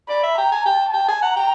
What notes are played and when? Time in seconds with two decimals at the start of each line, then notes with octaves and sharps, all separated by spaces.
0.09 D5 B5
0.24 E5
0.38 G5 A#5
0.52 G#5
0.66 G5 A5
0.94 G5
1.08 G#5
1.22 F#5 A#5
1.36 G5